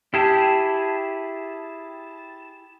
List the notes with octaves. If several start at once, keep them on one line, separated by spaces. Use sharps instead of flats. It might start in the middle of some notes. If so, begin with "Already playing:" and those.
E4 G4 G#4 A5